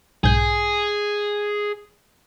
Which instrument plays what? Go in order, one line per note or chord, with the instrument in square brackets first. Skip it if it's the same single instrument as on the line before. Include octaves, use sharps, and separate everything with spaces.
[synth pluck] B1 G#2 G6 [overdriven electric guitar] G#4